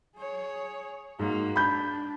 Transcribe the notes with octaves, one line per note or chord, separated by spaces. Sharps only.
G#4 C#5
G#2 A#3 F#4
D4 B5 G6